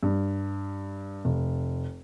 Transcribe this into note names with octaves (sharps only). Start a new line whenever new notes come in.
G2
F1